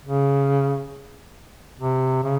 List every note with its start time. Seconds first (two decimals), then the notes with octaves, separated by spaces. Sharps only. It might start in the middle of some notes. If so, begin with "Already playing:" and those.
0.05 C#3
1.80 C3
2.24 C#3